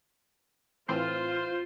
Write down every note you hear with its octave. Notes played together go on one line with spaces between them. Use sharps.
A2 E3 C4 F4 C5